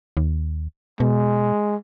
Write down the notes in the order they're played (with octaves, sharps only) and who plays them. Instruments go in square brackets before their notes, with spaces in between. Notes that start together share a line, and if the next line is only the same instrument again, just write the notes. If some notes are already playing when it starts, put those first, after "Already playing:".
[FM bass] D#2
[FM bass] B2 [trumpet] G#3